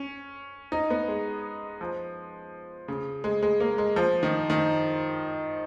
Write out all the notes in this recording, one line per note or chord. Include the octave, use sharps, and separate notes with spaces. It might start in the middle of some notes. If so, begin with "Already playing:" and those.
Already playing: C#4
D#4
B3
G#3
F3
C#3
G#3
G#3
A#3
G#3
F3
D#3
D#3